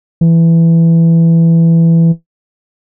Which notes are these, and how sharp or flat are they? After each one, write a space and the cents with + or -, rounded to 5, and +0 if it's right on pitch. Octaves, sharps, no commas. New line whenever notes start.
E3 +10